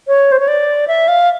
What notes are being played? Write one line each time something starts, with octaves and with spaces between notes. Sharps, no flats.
C#5
C5
C#5
D5
E5
F5